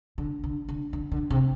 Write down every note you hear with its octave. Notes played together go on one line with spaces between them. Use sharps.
D3
D3
D3
D3
D3
C3